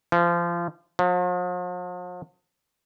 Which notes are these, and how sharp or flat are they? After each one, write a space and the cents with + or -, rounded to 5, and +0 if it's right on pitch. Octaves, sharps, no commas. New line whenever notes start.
F3 -25
F3 +45